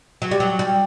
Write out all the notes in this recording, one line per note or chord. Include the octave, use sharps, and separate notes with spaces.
F#3
G3
F#3
G3